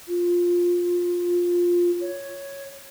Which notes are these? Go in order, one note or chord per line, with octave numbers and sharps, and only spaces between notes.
F4
C#5